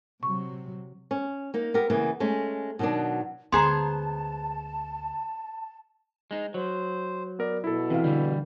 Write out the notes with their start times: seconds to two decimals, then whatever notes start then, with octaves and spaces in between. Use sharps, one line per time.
0.23 C3 F#3 C#6
1.11 C#4
1.54 A#3 D#4
1.74 B3 G4 A#4
1.90 C#3 E3 A#3 B3
2.20 G#3 A3 C#4
2.79 B2 D#3 F#3 B3 D4
3.52 D2 G#3 B3 G#4 C5 A5 A#5 C6
6.31 G#3 D#4
6.54 F#3 C5
7.39 B3 A#4 D5
7.64 B2 E4 A4
7.90 C3 E3 B4 F5
8.04 D3 E3 G3